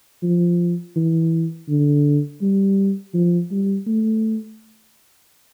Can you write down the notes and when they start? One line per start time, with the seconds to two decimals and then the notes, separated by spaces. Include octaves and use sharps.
0.23 F3
0.96 E3
1.69 D3
2.42 G3
3.14 F3
3.51 G3
3.87 A3